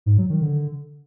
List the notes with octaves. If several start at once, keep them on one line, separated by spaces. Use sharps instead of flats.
G#2
F#3
D#3
D3